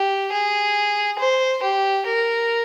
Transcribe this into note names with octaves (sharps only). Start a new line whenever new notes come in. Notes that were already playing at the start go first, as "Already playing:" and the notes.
Already playing: G4
G#4
C5
G4
A#4